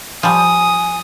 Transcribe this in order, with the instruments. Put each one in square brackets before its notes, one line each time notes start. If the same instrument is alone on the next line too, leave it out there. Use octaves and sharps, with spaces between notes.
[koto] F3 G3 [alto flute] G#5 [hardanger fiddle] D#6